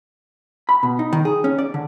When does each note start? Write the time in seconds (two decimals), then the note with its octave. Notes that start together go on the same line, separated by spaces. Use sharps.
0.69 B5
0.83 B2
0.99 D#4
1.13 D#3
1.25 G#4
1.44 C#4
1.59 D5
1.74 D3